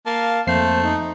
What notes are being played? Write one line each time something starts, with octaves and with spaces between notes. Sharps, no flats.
A#3 F5 A5
F2 A3 A#3 C5 C7
D#4